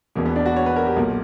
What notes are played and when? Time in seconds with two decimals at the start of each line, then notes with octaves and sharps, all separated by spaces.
0.16 E1 E2 B2 A#3
0.25 B3
0.36 D4
0.46 F#4
0.56 C#5
0.66 B4
0.76 A#4
0.86 G4
0.96 B1 A#2 A#3